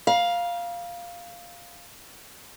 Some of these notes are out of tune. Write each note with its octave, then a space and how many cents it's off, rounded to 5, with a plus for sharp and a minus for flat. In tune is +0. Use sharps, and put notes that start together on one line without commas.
F5 +0 A#5 +45